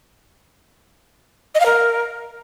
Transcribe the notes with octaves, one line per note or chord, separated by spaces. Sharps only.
D#5
F5
A#4